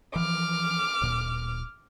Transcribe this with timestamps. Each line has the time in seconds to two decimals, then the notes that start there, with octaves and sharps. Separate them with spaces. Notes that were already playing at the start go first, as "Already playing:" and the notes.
0.16 E3 F3 D6 F6
1.01 D1 A#2